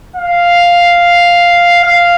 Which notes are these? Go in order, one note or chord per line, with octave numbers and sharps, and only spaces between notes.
F5
F5